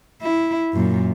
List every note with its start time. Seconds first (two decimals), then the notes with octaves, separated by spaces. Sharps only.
0.22 E4
0.73 F#2 A#2